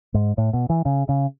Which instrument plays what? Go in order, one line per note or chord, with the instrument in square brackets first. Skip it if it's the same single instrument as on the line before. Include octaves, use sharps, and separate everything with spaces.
[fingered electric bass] G#2
A2
B2
E3
C#3
C#3